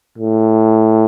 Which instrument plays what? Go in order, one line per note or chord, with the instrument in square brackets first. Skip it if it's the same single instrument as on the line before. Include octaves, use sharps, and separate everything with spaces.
[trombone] A2